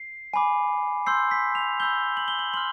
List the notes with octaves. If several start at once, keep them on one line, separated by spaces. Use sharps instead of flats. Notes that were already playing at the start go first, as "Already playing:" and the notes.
Already playing: C7
G#5 B5 D6
C6 E6 G6 C7
B6
F7
B5 E6 G6 G7
F#7
G7
F#7
C6 F6 F#7